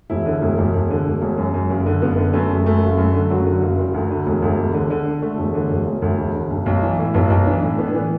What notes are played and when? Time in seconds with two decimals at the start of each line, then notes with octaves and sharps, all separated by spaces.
0.10 E1 E4
0.26 D3
0.42 E1
0.58 E1
0.74 E1
0.90 D3
1.06 E1
1.22 E1
1.38 F#2
1.54 F#2
1.70 F#1
1.86 D3
2.02 F#1 B3
2.18 D3
2.33 F#2 A3
2.50 F#1
2.66 F#2 A3
2.83 F#1
2.98 F#2
3.14 D3
3.30 F#1 F#3
3.46 D3
3.62 F#1
3.78 F#1
3.94 D2
4.10 D3
4.26 E1
4.42 D2
4.59 E1
4.74 D3
4.90 D3
5.06 D3
5.22 D3 A3
5.38 E1
5.54 D3
5.70 E1
5.86 E1
6.02 D2
6.18 E1
6.35 D3
6.50 B1
6.66 B1
6.83 E3
6.98 A2
7.14 B1 B3
7.30 B1
7.46 E3 D4
7.62 A2
7.78 A2 B3
7.87 D4
7.94 E3 B3